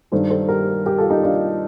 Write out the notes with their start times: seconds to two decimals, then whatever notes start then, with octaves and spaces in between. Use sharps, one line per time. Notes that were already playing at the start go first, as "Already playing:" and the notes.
0.12 G2 D#3 G3 A4 C5
0.30 A4 C5
0.48 G4 A#4
0.86 G4 A#4
0.98 F4 A4
1.10 D#4 G4
1.23 D4 F4